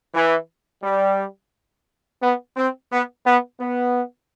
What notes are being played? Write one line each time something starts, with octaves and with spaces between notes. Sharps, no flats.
E3
G3
B3
C4
B3
B3
B3